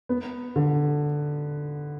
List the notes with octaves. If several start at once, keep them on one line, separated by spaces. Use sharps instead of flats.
B3
D3